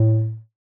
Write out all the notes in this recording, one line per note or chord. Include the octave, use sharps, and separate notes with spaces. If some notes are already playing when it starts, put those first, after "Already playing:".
Already playing: A2